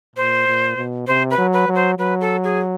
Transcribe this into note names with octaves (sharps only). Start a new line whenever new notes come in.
A#2 C5
A#2
B2
C3 C5
B4
F#3
B4
F#3
C5
F#3 B4
A4
G#4